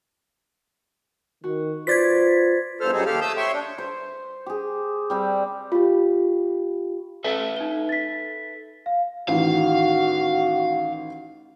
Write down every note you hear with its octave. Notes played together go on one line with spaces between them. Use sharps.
D#3 F#4
F4 B4 C5 D5 G#6 A6 B6
E2 G2 A4 C5 F6
F#2 F3 G3 D#4 G#4 A4
D#2 G4 A4 F5 F6
A3 A5 D#6 E6 G6
C#5 E5 G5 C6 C#6
D4
C5
G4 G#4
G3 C4 G4
F4 G4
A4 B4 E5
D#4 G7
A6 B6
F5
A1 D#3 F#4 F5